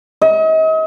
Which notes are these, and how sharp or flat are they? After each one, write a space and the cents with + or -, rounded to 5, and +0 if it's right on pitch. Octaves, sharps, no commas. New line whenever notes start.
D#5 +40